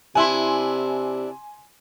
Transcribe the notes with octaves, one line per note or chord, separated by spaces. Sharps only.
C3 D4 E4 G#5 C6